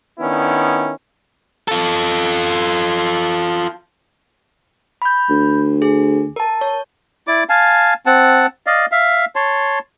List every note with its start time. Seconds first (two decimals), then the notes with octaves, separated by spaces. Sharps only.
0.19 D#3 B3 C#4 D4 E4
1.68 F4 A4
5.02 B5 G6
5.30 D2
5.82 G#4
6.36 A#4 A5
6.61 C#5
7.27 E4 D5 D6
7.49 F5 G#5 A5
8.06 C4 F#5 A5
8.67 D5 D#5 F5
8.92 E5 F5
9.36 C#5 A5 C6